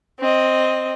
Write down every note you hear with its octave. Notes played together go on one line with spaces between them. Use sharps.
C4 D#5